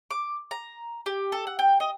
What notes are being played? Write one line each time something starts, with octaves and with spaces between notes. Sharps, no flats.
D6
A#5
G4
A4
F#5
G5
D#5